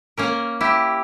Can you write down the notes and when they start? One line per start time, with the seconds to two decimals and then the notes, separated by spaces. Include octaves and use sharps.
0.17 A#3 C#4 A#4
0.61 E4 G4